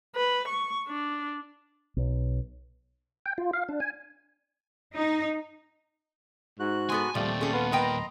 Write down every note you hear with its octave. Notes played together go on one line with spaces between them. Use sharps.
B4
C#6
D4
B1
G5
F4
F5
D4
G#5
D#4
G#2 F#4 F#6
G#3 B3 A4 G#5
D#2 A#2 F3 G3 A3 C4 D5
C#4 G#4 A4
B3 F5 C6
A#4 B4 D#5 G5 A#5 C6